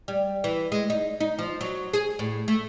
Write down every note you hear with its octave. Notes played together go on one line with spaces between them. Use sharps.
G3
E3
G#3
D#4
D#4
F3
F#3
G#4
A2
A3